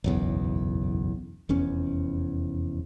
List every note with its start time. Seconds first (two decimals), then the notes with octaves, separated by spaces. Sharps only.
0.04 F#1 B1 E2
1.49 F1 E2 C#4